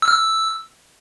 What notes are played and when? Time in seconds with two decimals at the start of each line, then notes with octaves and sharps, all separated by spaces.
0.02 E6
0.08 F6
0.13 E6